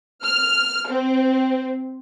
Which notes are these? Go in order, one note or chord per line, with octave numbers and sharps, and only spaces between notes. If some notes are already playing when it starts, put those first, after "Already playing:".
F6
C4